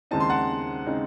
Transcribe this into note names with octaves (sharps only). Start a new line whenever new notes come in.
D#2 C#3 G#3 C4 D#4 A5
C6
F#5 A5
C#3 G#3 C4 D#4